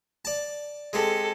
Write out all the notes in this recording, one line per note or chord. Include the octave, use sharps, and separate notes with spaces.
D5 A5
G#3 C4 G4 A4